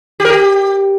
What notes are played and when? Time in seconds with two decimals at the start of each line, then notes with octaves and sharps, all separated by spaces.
0.20 G4
0.25 A#4
0.30 G4